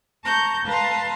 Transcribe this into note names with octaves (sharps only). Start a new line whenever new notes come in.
A5 A#5 C#6 G6
B4 F5 A5 A#5 C6